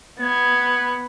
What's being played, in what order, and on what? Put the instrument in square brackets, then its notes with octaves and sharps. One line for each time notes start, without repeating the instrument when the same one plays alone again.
[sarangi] B3 [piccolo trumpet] G#6